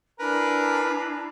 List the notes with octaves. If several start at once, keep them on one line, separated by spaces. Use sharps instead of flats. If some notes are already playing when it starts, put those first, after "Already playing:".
D4 E4 A#4 B4 G#5